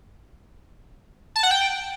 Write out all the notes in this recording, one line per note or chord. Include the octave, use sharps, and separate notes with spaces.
A5
F#5
G5